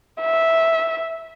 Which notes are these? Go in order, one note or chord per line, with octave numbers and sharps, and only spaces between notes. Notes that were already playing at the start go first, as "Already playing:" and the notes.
E5